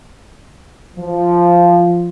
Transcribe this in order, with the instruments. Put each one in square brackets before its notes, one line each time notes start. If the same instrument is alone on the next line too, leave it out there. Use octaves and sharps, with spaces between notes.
[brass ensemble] F3